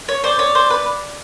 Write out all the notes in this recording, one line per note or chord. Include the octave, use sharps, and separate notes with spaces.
C#5
C5 D5
C#5
C5
B4